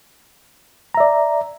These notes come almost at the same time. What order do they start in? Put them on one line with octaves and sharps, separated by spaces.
A#5 E5 D5